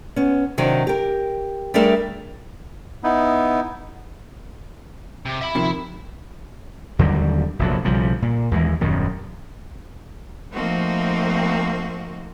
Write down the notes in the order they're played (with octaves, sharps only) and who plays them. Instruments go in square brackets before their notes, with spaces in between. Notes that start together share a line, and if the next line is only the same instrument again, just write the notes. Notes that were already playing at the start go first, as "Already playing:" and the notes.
[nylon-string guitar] B3 C#4
C3 D#3 F#3 D4
G4 A#4
G3 A3 D4 G#4 A#4 E5
[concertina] B3 D#4 E4
[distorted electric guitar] C3
E5 B5
[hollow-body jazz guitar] C3 D#3 F3
[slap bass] D#2 D3 F#3 G3
F1 A#1 F#3
B1 C#3 F3 G3
A#2
D#2 E3 G#3
D#1 F#2 D#3
[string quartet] F3 A3 A#3 C4 D#4 F#4